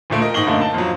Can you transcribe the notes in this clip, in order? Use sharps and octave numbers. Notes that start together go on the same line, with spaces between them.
D2 A#2 A3 D7
A#4 D#5
G#2 D#5 C#6 F#7 G7
F#2 D3 A3 A#3
A5
F2 F#3